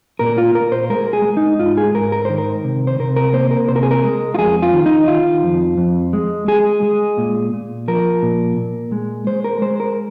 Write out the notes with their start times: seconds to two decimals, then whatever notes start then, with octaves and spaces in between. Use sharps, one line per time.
0.19 A#2 A#4
0.38 F4
0.54 A#2 A#4
0.72 C5
0.90 G#3 A#4
1.13 G#4
1.25 G#3
1.37 D#4
1.59 G#2 F4
1.77 G#4
1.94 G#2 A#4
2.12 A#4
2.25 D#3 C5
2.38 A#4
2.64 C3
2.87 C5
3.00 C3 A#4
3.16 A#4
3.33 A#3 C5
3.51 A#4
3.68 C3 C5
3.76 A#4
3.83 G#4
3.91 A#4
4.04 G#3
4.34 F4
4.38 F2 G#4
4.62 F4
4.74 D#3
4.86 D#4
5.08 D#3 F4
5.43 F2
5.78 F2
6.13 G#3
6.48 G#3 G#4
6.83 G#3
7.17 A#2
7.53 A#2
7.88 F3 A#4
8.23 A#2
8.57 A#2
8.92 G#3
9.27 G#3 C5
9.44 A#4
9.61 G#3 C5
9.80 A#4